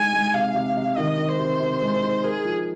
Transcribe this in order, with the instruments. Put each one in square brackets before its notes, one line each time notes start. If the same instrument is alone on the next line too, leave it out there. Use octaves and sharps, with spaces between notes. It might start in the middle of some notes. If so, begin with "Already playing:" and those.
Already playing: [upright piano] G#3 D#4 [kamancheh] G#5
[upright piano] G#3
[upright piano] C3 [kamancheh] F5
[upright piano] C3
C3
[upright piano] D#3 [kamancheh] D#5
[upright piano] D#3
[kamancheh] C5
[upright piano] C3
C3
G#3
D#4
[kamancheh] G#4 [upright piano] A#4
[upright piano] F3